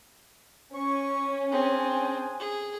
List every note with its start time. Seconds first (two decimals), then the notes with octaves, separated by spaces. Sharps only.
0.75 C#4 C#6
1.52 C4 D4 G#4 G#5
2.40 G#4